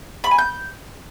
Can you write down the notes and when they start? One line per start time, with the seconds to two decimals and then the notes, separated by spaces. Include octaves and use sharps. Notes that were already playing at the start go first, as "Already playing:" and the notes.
0.24 B5
0.31 G#5
0.38 G6